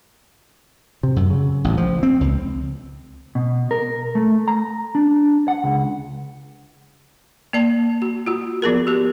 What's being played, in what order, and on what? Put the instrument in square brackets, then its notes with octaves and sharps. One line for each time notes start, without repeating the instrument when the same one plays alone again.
[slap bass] C3
F#2
C#3
A1
F3
C4
C#2
[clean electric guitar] B2
A#4
A3
A#5
D4
F#5
C#2
[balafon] A#3 D5 A5
F#4
F4 F#4
F3 B3 G#4 A#4
F#4 G4